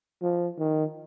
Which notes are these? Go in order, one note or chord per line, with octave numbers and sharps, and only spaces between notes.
F3
D#3